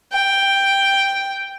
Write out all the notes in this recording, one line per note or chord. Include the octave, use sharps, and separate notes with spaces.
G5